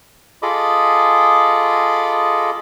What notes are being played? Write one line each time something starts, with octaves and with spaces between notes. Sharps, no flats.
F4 G#4 A4 D#5 B5 D6